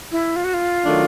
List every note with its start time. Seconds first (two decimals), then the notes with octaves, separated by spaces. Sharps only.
0.12 E4
0.36 F4
0.45 F#4
0.54 F4
0.85 D#3 F#3 A3 D4